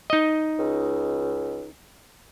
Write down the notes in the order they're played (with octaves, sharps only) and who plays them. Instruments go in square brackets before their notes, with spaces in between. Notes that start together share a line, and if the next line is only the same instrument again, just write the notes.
[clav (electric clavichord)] D#4 D#5
[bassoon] C#2